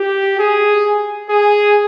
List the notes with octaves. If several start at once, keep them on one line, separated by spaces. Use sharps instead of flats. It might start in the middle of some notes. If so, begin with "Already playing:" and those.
Already playing: G4
G#4
G#4